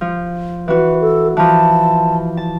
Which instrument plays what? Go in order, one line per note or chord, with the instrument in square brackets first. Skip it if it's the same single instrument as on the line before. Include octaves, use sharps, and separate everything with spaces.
[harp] F3
[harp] E3 F#4 [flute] B4
[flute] A4
[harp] E3 F3 [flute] A5
[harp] A5